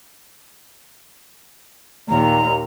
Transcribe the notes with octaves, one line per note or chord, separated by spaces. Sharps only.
D#2 A#2 A#5